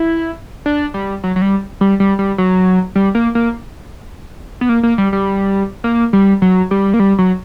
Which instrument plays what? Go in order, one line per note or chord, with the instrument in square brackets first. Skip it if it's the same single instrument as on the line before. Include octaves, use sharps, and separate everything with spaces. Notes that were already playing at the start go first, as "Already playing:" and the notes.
Already playing: [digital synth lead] E4
D4
G3
F#3
F#3
G3
G3
G3
G3
F#3
G3
A#3
A#3
B3
A#3
A#3
G3
G3
A#3
G3
F#3
G3
A#3
G3
F#3